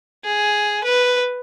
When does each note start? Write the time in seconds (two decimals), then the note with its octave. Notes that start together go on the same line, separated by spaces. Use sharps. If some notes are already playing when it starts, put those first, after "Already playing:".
0.25 G#4
0.84 B4